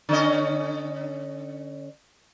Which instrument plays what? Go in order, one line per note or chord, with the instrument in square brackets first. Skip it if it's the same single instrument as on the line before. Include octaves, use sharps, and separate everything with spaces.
[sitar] D3 C#4 D#5